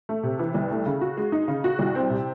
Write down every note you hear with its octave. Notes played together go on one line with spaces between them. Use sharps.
A3
C3
E3
C2
A3
C#3
F#4
G#3
D#4
C#3
F#4
C2
C4
C3